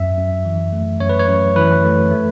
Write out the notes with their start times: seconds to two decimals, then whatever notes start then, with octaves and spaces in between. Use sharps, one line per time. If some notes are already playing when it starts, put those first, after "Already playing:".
Already playing: F#2 E5
0.17 F#2
0.45 E3
0.73 A3
1.00 F#2 C#5
1.09 B4
1.19 C#5
1.28 F#2
1.56 E3 B4
1.84 A3
2.11 A3